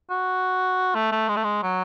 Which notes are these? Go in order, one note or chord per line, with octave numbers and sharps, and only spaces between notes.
F#4
A3
A3
G#3
A3
G#3
F#3